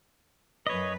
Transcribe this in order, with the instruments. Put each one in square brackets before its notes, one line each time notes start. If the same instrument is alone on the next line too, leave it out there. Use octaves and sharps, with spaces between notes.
[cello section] F#2 B4 [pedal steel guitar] C#5 D#5